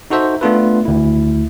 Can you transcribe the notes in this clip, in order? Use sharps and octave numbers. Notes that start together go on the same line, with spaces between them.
D#4 F#4 A4 C5 E5
A3 B3 D4 F4 A4 B4
D2 E4